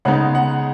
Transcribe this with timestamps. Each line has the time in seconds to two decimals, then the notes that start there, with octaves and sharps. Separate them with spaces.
0.05 C#3 G#3 B3 D#4 F#5
0.35 F#5